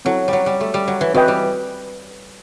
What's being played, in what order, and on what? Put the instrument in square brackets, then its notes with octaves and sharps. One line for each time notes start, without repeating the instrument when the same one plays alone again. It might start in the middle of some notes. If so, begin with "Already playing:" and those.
[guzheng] F#3 [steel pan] C4 E4 A4
[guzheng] F#3 G3
G3
A3
G3
F#3
E3
[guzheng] E3 [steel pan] C4 F#4 B4 D#5 G5
[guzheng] G3